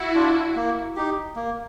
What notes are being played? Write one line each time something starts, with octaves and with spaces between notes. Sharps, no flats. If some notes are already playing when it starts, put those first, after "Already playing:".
Already playing: E4 F#4
D4 F4
A#3
D#4 G4
A#3